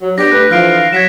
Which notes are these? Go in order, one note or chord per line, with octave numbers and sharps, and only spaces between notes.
F#3
B3 D4 G4 A#6
A3 D4 B4 F#6
D3 E3 F3 F5 F6 D7
F#3 F#5 G#6 B6 E7